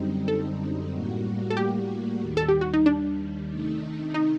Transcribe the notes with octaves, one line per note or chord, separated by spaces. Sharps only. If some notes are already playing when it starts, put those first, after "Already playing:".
Already playing: F#2 D3 G3 C4 D#4
A4
A2 G3 A#3 F#4
A4
G4
D#2 D#3 G3
A4
G4
F#4
D#4
D4
C3 D#3 A3 D#4
D#4